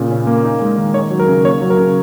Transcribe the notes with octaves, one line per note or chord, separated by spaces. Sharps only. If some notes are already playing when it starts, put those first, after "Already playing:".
Already playing: A#2 C#3
C#4
A#3
D#4
G#3
D#3
D#4 C#5
F#3
A#4
C#3
A#3 C#5
F#3
A#4
C#3